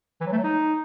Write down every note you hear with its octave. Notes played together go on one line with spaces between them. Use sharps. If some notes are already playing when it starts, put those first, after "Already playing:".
E3
F#3
A3
F#3
D#4